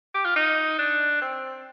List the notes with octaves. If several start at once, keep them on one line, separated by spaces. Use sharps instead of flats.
G4
F4
D#4
D4
C4